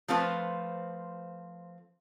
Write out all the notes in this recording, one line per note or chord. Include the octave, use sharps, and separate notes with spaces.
F3 A3 C4 F4 B4 C5